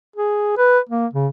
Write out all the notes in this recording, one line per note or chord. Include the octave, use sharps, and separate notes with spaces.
G#4
B4
A#3
C#3